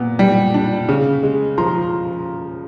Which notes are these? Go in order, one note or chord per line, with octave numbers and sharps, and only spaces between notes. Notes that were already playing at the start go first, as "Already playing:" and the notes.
Already playing: A#2 B3
G3
D4
C#3
G#3
F3 A#5 C6